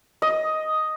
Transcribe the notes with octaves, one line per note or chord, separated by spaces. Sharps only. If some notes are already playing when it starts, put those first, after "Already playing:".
D#5